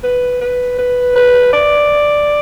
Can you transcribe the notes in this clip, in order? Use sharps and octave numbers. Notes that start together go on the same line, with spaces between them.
B4
B4
B4
B4
D5